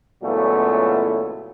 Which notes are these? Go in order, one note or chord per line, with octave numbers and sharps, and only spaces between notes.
C#2 A#2 E3 F#3 A3 B3